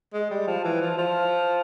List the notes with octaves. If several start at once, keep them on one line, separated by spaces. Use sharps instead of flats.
G#3
G3
F3
E3
F3
F3